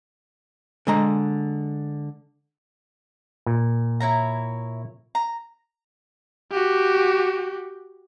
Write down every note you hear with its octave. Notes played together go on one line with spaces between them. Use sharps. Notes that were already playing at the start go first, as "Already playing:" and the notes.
D3 G#3 A#5
A#2
E4 C#5 A#5
A#5
F#4 G4